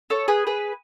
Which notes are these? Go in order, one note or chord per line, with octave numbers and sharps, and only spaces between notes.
A4 C#5
G#4 B4
G#4 B4